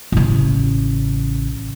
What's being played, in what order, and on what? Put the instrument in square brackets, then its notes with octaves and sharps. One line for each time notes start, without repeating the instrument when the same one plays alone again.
[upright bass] A1 C#3